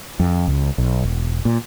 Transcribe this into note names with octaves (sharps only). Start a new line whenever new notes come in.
F2
C#2
B1
E1
A#2